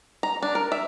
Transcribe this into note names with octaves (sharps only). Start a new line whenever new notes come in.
A#5
D4
A#4
E5